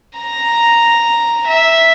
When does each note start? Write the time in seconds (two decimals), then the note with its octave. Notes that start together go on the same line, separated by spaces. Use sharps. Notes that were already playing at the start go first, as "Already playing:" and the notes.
0.19 A#5 A#6
1.48 E5